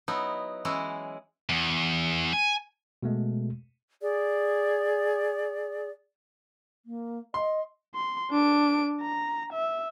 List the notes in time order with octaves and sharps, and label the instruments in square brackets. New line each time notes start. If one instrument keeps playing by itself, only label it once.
[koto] F#3 B3 D#4 E4
E3 F#3 G#3 C#4 E4 F#4
[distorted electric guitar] E2
G#5
[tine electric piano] B2 G#3 A3
[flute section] G#4 D5
[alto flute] A#3
[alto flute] D#5 [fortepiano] C6
[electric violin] C6
D4 D7
A#5
E5